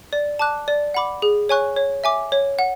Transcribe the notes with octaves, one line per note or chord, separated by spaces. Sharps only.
D5
A5 D6 F#6
D5
F#5 B5 D6
G#4
C#5 G#5 C#6 F#6
C#5
E5 G#5 D6
C#5
F#5